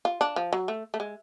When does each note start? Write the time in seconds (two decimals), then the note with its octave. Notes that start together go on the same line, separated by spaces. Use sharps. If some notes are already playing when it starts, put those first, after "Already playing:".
0.05 F4
0.21 D4
0.36 F3
0.53 F#3
0.68 A3
0.94 A3
1.00 G#3